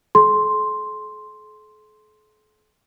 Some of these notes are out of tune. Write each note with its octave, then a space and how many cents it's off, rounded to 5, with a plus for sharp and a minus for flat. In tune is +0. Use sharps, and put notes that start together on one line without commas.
A4 -45 C6 +0